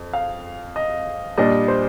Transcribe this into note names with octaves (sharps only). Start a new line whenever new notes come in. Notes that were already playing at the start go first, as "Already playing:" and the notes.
Already playing: F2
F5
D#5
A#2 G3 D4 D#5
C5